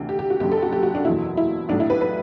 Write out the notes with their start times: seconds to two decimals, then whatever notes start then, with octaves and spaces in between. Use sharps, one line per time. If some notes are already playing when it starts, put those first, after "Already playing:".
Already playing: D2 C3 E3
0.09 G4
0.19 G4
0.30 F#4
0.40 F#1 F#2 D3 G4
0.52 A4
0.62 F#4
0.73 G4
0.83 F#4
0.95 D4
1.05 F#1 E2 B2 F#3 E4
1.37 E4
1.69 B1 A2 F#3 D4
1.80 E4
1.90 B4
2.01 B4